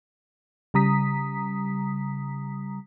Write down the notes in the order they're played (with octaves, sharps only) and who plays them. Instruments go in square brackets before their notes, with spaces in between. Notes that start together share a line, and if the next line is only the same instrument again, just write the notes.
[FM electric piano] C#3 G3 A#5 D#6 B6